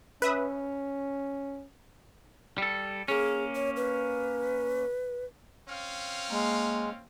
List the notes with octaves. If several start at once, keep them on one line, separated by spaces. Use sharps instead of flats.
C#4 B4 E5 D#6
G3 A4
A#3 C#4 G#4
C#5
B4
C4 C#4 F5
G#3 A#3